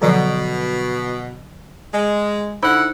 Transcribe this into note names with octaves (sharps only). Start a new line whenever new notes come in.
B2 D3 F3 F#3
G#3 G#5
D3 D#4 E4 C5 F#5 B5